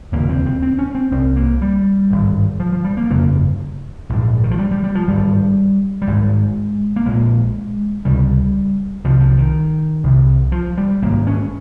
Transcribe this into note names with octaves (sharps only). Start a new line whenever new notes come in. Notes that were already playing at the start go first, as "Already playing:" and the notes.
F1 D#2 C#3 A#3
C4
C4
C4
C#4
C4
C2 C3 C4
A#3
G3
G#1 G2
F3
F3
G3
A#3
G1 F2 C#3 A#3
A#1 G#2
D#3
F3
G3
G3
G3
F3
G#1 G2 G3
G3
G#1 G#2 G#3
A#3
A#1 A#2 G#3
C#2 C3 G3
C2 C3 F3
F3
D#3
C2 C3
F3
G3
G#1 G#2 A#3
C#4